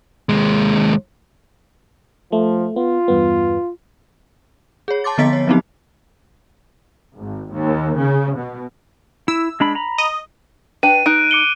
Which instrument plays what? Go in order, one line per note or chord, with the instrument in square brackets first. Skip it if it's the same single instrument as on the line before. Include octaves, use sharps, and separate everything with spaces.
[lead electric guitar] D#2 G#3
[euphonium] F3 [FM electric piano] A3
[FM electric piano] B3 [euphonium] F4
[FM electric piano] E2 G2 B3
[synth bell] G#4 C#5
A5 C6 D6 A6
D3 F3 B3 D#5 A6 B6
C#5
F3 F#3 B3 C4 D#4 G4
[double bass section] G#1
D#2
C#3
B2
[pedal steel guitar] E4 [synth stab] E6
[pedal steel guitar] G#3 D4 B5
A#5 B5
[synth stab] D#5
[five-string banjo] D4 B4 G5 [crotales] D#7
[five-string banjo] D#4 [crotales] F#6 D7
[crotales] D6 C#7 G7